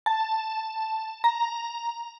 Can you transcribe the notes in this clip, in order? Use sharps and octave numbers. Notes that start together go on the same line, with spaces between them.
A5
A#5